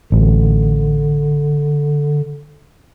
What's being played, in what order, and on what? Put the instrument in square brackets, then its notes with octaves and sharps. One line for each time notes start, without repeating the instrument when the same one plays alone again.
[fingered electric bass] A1 [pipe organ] D3